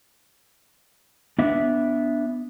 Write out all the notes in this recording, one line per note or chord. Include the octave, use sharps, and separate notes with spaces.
B3 D4 E5